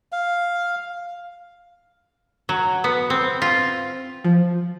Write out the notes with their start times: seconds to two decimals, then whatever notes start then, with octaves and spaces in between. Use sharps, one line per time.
0.12 F5
2.49 F#3
2.84 B3
3.10 C4
3.42 F4
4.24 F3